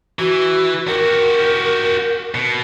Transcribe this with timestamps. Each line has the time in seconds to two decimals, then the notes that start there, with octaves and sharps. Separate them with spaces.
0.19 E3 F#4
0.88 F#4 G4 A#4
2.35 B2